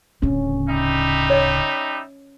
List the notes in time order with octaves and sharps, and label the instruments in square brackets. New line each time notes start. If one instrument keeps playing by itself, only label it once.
[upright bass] D1 C#3 [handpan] C#4
[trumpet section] G3 D#4 E5
[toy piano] C#5 D#5